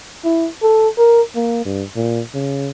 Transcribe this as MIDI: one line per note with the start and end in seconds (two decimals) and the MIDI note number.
0.24 0.48 64
0.62 0.88 69
0.98 1.21 70
1.35 1.64 58
1.65 1.84 43
1.96 2.21 46
2.34 2.71 49